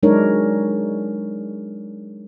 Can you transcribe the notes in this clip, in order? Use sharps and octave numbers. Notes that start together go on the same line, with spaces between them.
F#3 G#3 D4 D#4 A#4 C#5